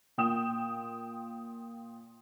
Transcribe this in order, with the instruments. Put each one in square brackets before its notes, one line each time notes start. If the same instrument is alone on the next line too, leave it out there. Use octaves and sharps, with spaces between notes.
[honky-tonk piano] A#2 G5 D#6 E7